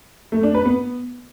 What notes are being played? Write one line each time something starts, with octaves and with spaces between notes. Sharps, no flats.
A3
D4
B4
B3